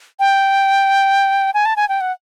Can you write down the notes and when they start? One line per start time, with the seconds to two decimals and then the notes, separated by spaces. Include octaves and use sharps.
0.20 G5
1.54 G#5
1.65 A5
1.76 G#5
1.89 G5
2.01 F#5